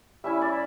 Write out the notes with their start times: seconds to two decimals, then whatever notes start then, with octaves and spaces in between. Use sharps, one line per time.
0.24 G3 C#4 E4 E5
0.41 D5